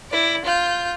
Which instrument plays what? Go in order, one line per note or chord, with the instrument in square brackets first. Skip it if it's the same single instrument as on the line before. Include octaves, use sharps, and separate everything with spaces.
[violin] E4 D5
F4 G6